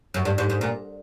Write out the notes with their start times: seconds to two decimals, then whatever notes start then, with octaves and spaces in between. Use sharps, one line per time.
0.14 F#2
0.25 G2
0.38 G#2
0.50 G#2
0.61 A#2